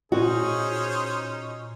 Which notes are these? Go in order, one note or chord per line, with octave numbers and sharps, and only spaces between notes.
A#2 C#4 D#4 F#4 G#4 C5